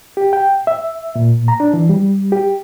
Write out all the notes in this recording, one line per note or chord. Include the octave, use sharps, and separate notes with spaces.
G4
G5
E5
A#2
A#5
D4
E3
G3
G4